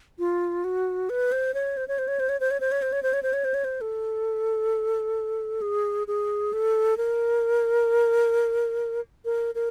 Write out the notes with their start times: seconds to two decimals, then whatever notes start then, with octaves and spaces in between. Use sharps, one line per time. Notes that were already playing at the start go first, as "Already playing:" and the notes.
0.19 F4
0.64 F#4
1.10 B4
1.32 C5
1.54 C#5
1.77 C5
1.88 C#5
1.98 C5
2.08 C#5
2.20 C5
2.29 C#5
2.40 C5
2.51 C#5
2.60 C5
2.72 C#5
2.82 C5
2.92 C#5
3.03 C5
3.13 C#5
3.23 C5
3.33 C#5
3.44 C5
3.54 C#5
3.64 C5
3.81 A4
5.62 G#4
6.07 G#4
6.53 A4
6.97 A#4
9.25 A#4
9.55 A#4